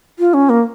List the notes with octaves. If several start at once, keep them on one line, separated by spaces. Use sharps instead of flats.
F4
C#4
A#3